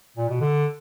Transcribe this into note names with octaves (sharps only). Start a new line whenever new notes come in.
A#2
B2
D3